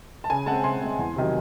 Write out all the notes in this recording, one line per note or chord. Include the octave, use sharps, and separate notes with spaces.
A5
C#3 G#5
G#3 C4 F#5 A5
C#3 G#5 C6
G#3 C4
E2
C3 D#3 F#3